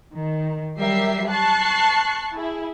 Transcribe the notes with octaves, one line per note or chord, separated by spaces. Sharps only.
D#3
F#3 G3 G4 A#4 E5 C7
A5 C#6 F#6 C7
E4 G#4